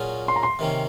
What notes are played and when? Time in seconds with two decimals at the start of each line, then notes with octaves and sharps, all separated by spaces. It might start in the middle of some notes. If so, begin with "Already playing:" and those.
Already playing: A#2 F#3 C#4 F4 G#4
0.28 C6
0.36 A#5
0.43 C6
0.59 C3 D#3 A#3 C#4